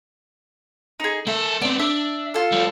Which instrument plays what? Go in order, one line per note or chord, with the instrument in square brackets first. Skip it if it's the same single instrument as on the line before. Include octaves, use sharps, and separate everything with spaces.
[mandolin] D#4 G#4
[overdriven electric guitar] A#3 E5 [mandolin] A4
[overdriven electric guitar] B3 C4 [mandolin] D5
[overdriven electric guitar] D4 [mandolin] E5
[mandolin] F4 A4
[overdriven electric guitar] F3 G3